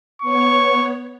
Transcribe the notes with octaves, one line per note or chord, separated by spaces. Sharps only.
B3 C#5 C#6